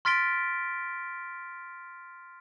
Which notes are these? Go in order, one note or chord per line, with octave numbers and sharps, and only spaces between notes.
C6 F6 A6 B6 D7 G7